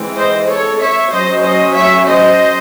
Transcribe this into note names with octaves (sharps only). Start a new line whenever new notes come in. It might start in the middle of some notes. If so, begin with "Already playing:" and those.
Already playing: E3 G#3 C4
C5 D#5
A4 C#5
C#5 E5
F#3 C#4 C5 D#5
C5 D#5
C#5 E5
C5 D#5